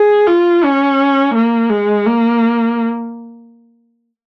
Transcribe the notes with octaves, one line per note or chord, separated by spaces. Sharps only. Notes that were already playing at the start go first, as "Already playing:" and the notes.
Already playing: G#4
F4
C#4
A#3
G#3
A#3